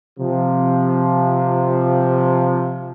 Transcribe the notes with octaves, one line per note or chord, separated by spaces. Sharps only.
C3 F3